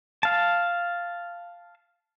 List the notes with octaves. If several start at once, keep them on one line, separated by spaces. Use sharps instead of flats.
F5 A5